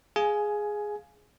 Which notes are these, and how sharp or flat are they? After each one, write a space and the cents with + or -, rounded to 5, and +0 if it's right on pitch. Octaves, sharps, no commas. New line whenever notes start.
G#4 +0 F5 +0 G#5 +15